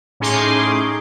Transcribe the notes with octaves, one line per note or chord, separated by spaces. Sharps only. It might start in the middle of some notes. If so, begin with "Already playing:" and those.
A2 C#4 D#4 G#4 C6 D6